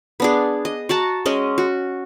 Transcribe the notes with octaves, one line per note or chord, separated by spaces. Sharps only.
B3 D4 G#4
D#5
F#4 F#5 A5 A#5
G#3 C#4 D#5
F#4